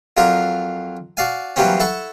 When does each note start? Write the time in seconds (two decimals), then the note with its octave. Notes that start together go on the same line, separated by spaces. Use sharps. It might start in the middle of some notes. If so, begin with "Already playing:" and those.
0.17 F2 F3 F#3 F4 A#4 D6
1.17 F#4 D5 F5 G#5
1.56 E3 F#3 G3 A#3 C4 C#4
1.80 E4 A4 F#5 C#6